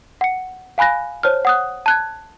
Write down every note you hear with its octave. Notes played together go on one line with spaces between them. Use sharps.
F#5 C#7
F5 G#5 B5 F#6 A#6
C5 C#5 A5 F6
F#5 D#6 F#6
A5 F#6 G#6